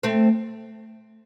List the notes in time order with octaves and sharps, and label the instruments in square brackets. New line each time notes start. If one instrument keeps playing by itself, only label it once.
[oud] A3 C4